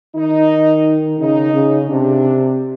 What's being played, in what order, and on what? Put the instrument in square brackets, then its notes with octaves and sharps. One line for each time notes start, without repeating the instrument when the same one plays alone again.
[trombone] D#3 [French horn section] D#4
[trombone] C#3 [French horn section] D#4
[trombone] C#3
[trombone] C3 [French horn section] D4